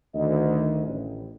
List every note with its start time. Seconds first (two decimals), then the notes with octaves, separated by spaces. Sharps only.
0.15 D2 D#3 D#5
0.87 A1